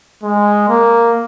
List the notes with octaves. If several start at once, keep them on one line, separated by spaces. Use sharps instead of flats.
G#3
A#3